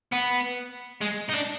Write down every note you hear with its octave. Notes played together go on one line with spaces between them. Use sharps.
B3
G#3
D#4
D4